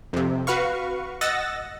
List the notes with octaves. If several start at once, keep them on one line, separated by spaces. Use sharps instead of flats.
F2 C3
F#4 B4 F5 C#6
D#5 F#5 E6 A6 A#6